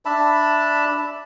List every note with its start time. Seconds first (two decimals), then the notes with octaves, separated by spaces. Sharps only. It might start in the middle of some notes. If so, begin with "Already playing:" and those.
0.05 D4 E5 A5 B5